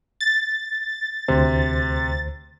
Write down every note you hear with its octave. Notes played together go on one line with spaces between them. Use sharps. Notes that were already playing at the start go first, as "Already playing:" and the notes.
A6
D2 C3 C5